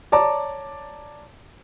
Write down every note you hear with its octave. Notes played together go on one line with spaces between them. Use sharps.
C#5 D5 A5 A#5 D6